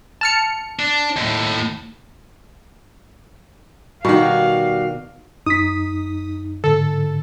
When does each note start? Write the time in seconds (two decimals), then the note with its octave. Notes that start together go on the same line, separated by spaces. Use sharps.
0.21 A5 F6 C#7
0.79 D4
1.17 D#2 A2
4.05 B2 D#3 G3 F#4 F5
5.46 F#2 D#4 D#6 B6
6.64 G#2 D3 A4